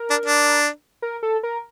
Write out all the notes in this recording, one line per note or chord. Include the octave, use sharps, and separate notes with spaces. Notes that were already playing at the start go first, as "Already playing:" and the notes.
Already playing: A#4
D4
D4
A#4
A4
A#4